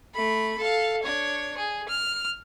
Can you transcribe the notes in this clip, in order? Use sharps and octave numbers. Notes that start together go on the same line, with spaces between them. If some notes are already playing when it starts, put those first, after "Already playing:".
A3 B5
A4 F5
D4 C#5
G#4
F6